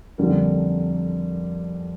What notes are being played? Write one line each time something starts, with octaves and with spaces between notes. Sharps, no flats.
F2 D3 G3 A#3